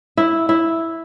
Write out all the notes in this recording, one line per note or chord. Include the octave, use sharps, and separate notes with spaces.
E4
E4